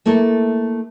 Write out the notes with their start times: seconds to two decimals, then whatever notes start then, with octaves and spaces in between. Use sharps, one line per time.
0.06 A3 A#3 E4 A4